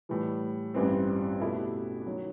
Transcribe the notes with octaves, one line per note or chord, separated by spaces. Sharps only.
A2 E3 G3
A1 G2 E3 G3 C4
B2 A3 E4 G4
D#3 F#3